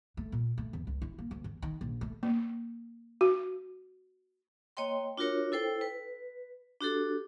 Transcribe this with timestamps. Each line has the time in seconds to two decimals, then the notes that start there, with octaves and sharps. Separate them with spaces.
0.17 A3
0.32 A#2
0.58 A3
0.73 E2
0.87 C#2
1.02 E4
1.18 A#3
1.31 D2
1.44 E2
1.62 D#3
1.81 A#1
2.01 A3
2.23 A#3
3.21 F#4
4.77 A#3 C#5 D#5 G5 C6
5.18 D4 F4 F#4 A#4 C#5
5.52 E4 A4 C5 G5
5.81 B4
6.81 D4 F#4 G4 A4